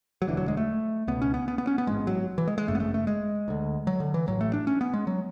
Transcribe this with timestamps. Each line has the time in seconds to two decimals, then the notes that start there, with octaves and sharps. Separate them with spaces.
0.22 F#3
0.27 E1 D2 D3 E3
0.37 F#3
0.48 G#3
0.57 A3
1.08 C#2 B2 B3
1.22 C#4
1.34 B3
1.48 B3
1.58 B3
1.67 C#4
1.78 B3
1.87 A1 G#2 G#3
2.07 F#3
2.38 E3
2.47 G#3
2.58 G#3
2.68 G#1 F#2 C#3 A3
2.75 B3
2.80 A3
2.94 A3
3.07 G#3
3.48 D2 D3
3.87 F#3
4.00 D3
4.14 E3
4.27 A1 A2 F#3
4.41 A3
4.53 D4
4.67 C#4
4.81 B3
4.94 G#3
5.07 F#3